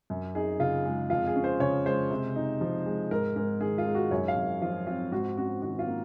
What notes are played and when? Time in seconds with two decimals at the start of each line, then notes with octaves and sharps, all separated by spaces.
0.10 F#2
0.35 D#4 G#4
0.59 C#3 F4
0.85 G#3
1.10 F2 F4
1.27 G#4
1.36 C#4
1.44 C5
1.60 C#3 C#5
1.85 G#3 C5
2.11 C3
2.35 D#4
2.61 F3
2.86 G#3
3.11 G#2 A#4
3.36 G#2 A#4
3.61 D#3 G#4
3.78 F4
3.86 G#3
3.95 F#4
4.11 F#2 C#5
4.28 F5
4.37 F#2
4.61 F3 F4
4.87 C4 F4
5.11 G#2 F#4
5.37 C#4 F#4
5.62 D#3 F#4
5.79 F4
5.87 A#3